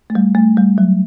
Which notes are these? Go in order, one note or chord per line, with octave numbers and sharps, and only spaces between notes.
A3
G3
A3
G3
F#3